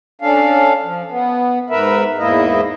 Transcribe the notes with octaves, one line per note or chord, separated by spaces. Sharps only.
C#4 D4 A4 F5
F3
B3
G#2 A#4 B4 E5
E2 G#2 A#3 E4 D#5